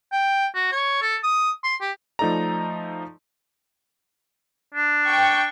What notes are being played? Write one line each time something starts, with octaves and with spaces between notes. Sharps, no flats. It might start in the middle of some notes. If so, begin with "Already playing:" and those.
G5
F#4
C#5
A4
D#6
C6
G4
F3 A3 D#4 A4 D5 A#5
D4
G5 C#6